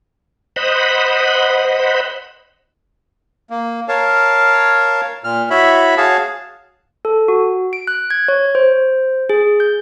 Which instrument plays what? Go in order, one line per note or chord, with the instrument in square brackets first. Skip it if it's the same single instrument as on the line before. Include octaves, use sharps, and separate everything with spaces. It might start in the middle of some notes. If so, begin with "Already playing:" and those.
[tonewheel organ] C5 D#5 F#5 B5
[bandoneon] A#3
A#4 C#5 F5 A5
A#2 F6
E4 F#4 C#5 E5 B5
F#4 G#4 C#5 F5 A5
[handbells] A4
F#4
D7
F#6
G#6
C#5
C5
G#4
G6